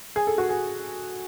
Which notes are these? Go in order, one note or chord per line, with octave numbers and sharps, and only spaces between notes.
G#4
A4
F#4
G#4